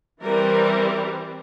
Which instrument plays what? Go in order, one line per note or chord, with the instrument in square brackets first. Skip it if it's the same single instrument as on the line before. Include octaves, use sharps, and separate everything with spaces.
[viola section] E3 G3 C4 A#4